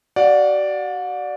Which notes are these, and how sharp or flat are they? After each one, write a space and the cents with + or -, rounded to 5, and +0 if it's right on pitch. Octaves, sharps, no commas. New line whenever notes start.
F#4 +40 D5 +0 F#5 -45